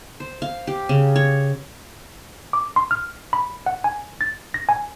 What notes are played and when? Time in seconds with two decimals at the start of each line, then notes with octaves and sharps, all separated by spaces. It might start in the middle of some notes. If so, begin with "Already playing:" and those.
0.20 C5
0.42 F5
0.67 G4
0.89 C#3
1.16 C#5
2.53 D6
2.76 C6
2.91 F6
3.33 B5
3.66 F#5
3.84 G#5
4.21 A6
4.54 A#6
4.69 G#5